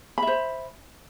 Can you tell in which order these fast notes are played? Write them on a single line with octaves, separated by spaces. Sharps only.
B5 E5 C5